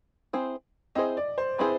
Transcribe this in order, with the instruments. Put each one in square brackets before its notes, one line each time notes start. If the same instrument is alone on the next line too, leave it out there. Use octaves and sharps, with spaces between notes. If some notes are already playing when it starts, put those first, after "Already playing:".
[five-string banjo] C4 E4 G#4 C5
[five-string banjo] C4 E4 G#4 C5 [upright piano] D#5
[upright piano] D5
C5
[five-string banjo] C4 E4 G#4 C5 [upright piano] B4